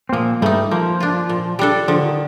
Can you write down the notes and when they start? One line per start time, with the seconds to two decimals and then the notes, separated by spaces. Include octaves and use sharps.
0.09 C4
0.13 A#2 F3 A#3
0.41 G2 G3 A3 D#4
0.71 F3 A#3
1.00 D4 F4
1.29 A#2
1.59 G3 D4 A4
1.88 D3 F3
2.03 D#3